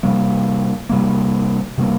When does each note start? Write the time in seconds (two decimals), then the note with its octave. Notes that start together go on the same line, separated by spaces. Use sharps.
0.03 C3 G3 A#3
0.89 C3 G3 A#3
1.78 C3 G3 A#3